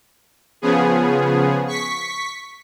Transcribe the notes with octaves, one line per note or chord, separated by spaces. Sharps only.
C#3 F3 B3 G#4
C#6 B6